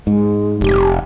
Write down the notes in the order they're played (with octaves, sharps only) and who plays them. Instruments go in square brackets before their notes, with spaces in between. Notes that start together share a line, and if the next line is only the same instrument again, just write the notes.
[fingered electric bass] G#2 [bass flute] G#3
[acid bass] F1 [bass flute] G4